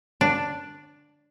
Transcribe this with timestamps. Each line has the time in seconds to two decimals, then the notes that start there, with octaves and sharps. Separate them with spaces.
0.21 D4